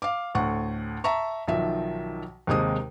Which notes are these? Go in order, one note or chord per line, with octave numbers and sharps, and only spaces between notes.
F5 D6
D2 A2 F#5 C#6
E5 A5 A#5 C#6
B1 D#3 F3 E5
D#2 C3 D#3 G#3 C5 D#6